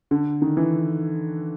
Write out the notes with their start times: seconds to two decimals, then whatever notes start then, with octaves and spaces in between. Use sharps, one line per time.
0.11 D3
0.42 D#3
0.57 E3